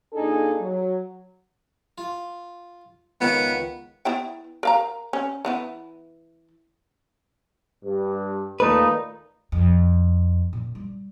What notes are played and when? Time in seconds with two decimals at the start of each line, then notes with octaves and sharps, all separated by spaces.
0.13 A#2 D4 D#4 G#4 A4
0.60 F#3
1.98 F4
3.21 C#2 D#3 B3
4.05 B3 E4 G5
4.63 A#4 F5 A#5
5.13 C#4
5.45 E3 B3 E4
7.84 G2
8.60 D#2 A#2 A3 A#3 D#4 B4
9.52 F2
10.53 A#2
10.75 G3